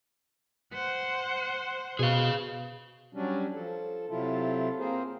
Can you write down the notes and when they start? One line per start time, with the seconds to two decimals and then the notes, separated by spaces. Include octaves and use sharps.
0.73 C5 F#5
1.99 B2 G#4 F5
3.14 F#3 G3 C#4 D4
3.54 F3 A4
4.10 C3 F#3 E4 F4 A4
4.79 A#3 C4 G#4 A#4 C5